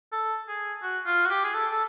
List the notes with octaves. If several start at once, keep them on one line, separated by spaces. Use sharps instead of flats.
A4
G#4
F#4
F4
F#4
G4
G#4
A4
A4